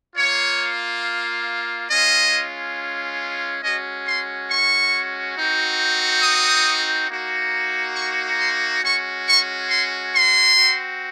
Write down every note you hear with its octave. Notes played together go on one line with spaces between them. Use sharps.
A#3 F4 C#5
G#3 C#4 F4 D#5
G#3 C#4 F#4 D#5
C6
C#6
C4 D#4 F#4
D#6
A#3 D#4 F#4
C#6
C6
G#3 C#4 F#4 C#6
C#6
C6
C6
C4 F#4